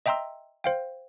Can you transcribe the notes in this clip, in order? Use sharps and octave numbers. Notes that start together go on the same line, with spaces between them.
D#5 E5 G5 A#5 C6 E6
C5 F5 G5